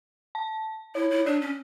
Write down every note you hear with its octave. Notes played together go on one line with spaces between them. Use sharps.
A5
E4 C#5
E4
D4 D5
C#4